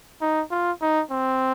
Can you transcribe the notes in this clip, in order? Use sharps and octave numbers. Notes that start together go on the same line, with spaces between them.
D#4
F4
D#4
C4